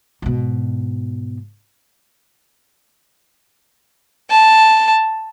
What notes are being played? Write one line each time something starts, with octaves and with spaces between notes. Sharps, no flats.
G#2 B2
A5